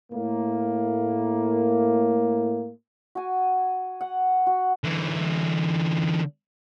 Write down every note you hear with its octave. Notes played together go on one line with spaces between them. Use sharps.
A2 A#3
F#4 G#5
F#5
F#4
D3 E3